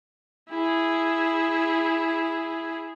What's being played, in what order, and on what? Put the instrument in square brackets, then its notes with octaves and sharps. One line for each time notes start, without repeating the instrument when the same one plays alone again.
[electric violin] E4 G#4